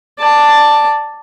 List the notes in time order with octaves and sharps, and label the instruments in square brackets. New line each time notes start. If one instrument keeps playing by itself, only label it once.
[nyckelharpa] D5 A5